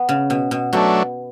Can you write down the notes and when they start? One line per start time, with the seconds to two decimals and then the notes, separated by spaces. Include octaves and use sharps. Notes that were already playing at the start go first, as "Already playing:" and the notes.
Already playing: B3
0.09 C#3
0.30 B2
0.51 B2
0.73 B2 F#3 A3 D4